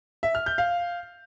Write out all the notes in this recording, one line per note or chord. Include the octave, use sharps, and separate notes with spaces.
E5
F6
G6
F5